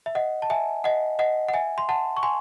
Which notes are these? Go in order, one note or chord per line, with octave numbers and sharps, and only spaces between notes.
E5
D#5 F#5
A5
E5 G#5
D#5 F#5
D#5 F#5
F#5
E5 G#5
C6
F#5 A5
C#6
G#5 C6